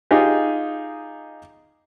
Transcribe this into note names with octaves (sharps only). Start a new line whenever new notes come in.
D#4 F4 G4 G#4